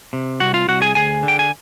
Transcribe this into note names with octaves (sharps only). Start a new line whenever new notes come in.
C3
C2 F#4 F#5
F4 F5
C2 F#4 F#5
G#4 G#5
D2 G#4 G#5
D3
G5
G#5